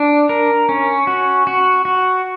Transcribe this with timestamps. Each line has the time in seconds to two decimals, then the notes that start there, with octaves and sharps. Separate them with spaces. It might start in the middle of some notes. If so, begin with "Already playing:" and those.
Already playing: D4
0.29 A#4
0.69 C#4
1.07 F#4
1.47 F#4
1.85 F#4